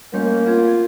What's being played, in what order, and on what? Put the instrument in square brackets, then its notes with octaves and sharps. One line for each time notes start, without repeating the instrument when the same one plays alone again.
[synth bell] G3 A3 G6 [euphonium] A#3 [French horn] C#4
[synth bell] C4 F5 G#6 [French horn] F4